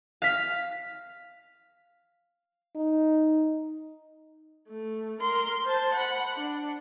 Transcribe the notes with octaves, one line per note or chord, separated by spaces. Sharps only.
F5 B6
D#4
A3
A#4 C6
C5 A5
F#5 B5
D4